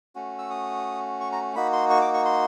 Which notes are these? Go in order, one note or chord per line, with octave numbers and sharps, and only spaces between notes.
A3 C#4 F#4
E6
D#6
C#6
A#5
A#3 D#4 F#4 B5
C6
C#6
D6
C#6
C6